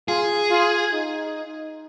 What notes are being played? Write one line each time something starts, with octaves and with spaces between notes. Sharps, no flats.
F4 G#4
F4
D#4